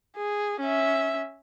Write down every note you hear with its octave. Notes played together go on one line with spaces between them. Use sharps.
G#4
C#4 E5